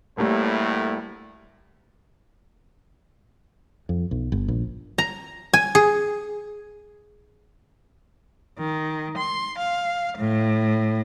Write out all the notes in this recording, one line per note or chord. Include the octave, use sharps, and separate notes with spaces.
D2 A2 G3 A3 A#3
F2
B1
G1
A#1
A#5
G#5
G#4
D#3
C6
F5
A2